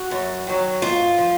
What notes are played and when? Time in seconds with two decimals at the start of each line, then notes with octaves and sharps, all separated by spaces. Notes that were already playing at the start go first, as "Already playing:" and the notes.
Already playing: F#4
0.11 F#2
0.47 D#3 F#3
0.82 G#2 F4
1.18 F3